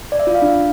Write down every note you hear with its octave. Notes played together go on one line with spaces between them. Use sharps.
D5
E5
F4
F5
D4